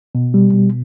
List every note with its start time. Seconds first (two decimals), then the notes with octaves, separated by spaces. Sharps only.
0.15 B2
0.34 G3
0.54 B2